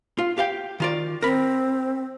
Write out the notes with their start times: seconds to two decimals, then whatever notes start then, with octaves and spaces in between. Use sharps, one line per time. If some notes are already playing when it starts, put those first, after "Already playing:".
0.18 F4
0.38 G4 F5 G5
0.80 D#3 F4 D5
1.22 C4 A#4 B5